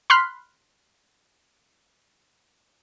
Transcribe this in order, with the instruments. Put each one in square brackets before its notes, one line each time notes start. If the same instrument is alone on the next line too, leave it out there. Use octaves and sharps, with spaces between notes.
[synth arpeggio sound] B5 C6 F6 F#6 B6 C7